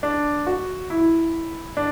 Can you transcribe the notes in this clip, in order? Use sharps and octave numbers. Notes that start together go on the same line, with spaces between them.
D4
F#4
E4
D4